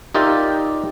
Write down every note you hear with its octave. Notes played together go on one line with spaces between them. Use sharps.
D#4 F4 G4 A#4 D5 E5